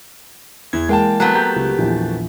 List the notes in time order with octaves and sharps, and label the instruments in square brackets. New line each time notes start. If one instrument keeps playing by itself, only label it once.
[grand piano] E2 [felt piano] E3 [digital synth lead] G#6
[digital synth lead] G#3 [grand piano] A#3 G5 A5
[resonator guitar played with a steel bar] F#3 A3 B3
[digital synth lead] G4 [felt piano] A#5 G6
[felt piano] C#2
A#1 E2